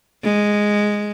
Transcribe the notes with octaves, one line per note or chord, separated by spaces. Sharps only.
G#3